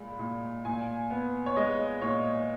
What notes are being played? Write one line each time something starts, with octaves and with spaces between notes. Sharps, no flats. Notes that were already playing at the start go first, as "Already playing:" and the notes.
Already playing: A#2 G#3 B5
A#2
A#2 G#5
B3
C#5
G#3 D#5
A#2 C#5